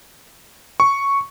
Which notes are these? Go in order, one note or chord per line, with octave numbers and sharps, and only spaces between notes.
C#6